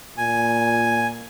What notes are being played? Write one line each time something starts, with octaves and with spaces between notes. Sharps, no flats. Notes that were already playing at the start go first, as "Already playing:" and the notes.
A#2 G#5